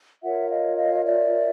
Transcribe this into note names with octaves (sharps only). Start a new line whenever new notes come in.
F4 A#4 C#5 E5 F#5
D#5 F5
D#5 F5
D#5
D5 E5